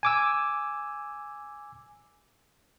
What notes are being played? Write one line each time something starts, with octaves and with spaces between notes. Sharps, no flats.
G#5 D6 E6